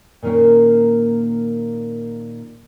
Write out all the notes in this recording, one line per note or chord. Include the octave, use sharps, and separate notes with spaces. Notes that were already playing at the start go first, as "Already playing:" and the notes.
A#2 D#3 A#3 C#4 G5